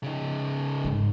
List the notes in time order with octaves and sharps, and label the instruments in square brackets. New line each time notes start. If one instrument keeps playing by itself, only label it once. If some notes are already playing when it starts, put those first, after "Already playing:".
[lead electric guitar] C#3 D#4
[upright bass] G#2